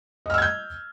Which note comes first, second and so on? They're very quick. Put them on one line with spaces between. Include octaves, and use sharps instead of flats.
D#5 F6 E6 G#6 G6